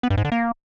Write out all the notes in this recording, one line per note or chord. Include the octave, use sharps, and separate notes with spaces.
B3
G2
G#2
D3
A#3